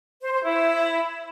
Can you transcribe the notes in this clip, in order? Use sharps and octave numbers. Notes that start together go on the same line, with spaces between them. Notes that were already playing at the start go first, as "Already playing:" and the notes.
C5
C5
E4